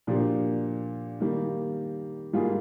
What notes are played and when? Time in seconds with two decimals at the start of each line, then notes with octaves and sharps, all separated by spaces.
0.07 A#2 F3 A#3 D4 G4
1.20 D#3 G3 A#3
2.33 G#2 G3 A#3 F4 G#4